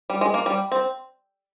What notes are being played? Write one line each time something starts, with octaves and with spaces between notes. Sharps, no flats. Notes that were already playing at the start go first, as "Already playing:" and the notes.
G3
G#3
A#3
G3
C4